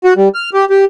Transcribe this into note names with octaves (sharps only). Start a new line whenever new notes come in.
F#4
G3
F6
G4
G4